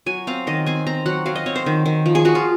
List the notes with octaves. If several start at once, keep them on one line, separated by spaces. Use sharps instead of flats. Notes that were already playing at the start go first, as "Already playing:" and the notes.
F#3 G#5
C4 F5
D#3 D#5
C4 G#5
C4 A#5
F#3 F#5
F#3 F5
D#5
C4 C#5
C5
D#3
D#3
F3
G#4
F3 F#4
F4